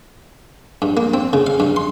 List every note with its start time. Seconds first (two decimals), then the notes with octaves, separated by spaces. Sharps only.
0.82 G2
0.97 A#3
1.14 C4
1.33 C#3
1.46 F5
1.60 G2
1.76 C6